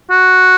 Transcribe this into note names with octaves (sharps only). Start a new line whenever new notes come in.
F#4